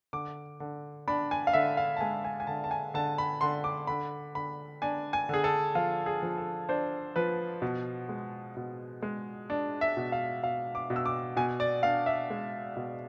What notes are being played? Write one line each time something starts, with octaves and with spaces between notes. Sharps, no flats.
D3 D6
D3
D4 B5
G#5
F5
D3 E5
F5
A5
G#3 G#5
G#5
G#5
D3 A5
A5
G#5
D3 A5
B5
D3 C6
D6
D3 B5
D3 B5
D4 G#5
G#5
D3 G#4
A4
F3 F4
G#4
F3
A4
D4 C5
F3 B4
B2
G#3
B2
G#3
D4
E5
B2
F5
B2 F5
D6
B2
E6
D6
B2 G#5
D5
D4 F5
E5
G#3
B2